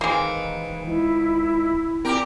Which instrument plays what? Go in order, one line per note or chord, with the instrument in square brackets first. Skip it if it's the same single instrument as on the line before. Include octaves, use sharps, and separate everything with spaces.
[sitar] D#3 C4 [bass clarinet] E3 [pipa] G#3 A#3
[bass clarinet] C#2 [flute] E4
[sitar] A#2 G4 A#4 [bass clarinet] C4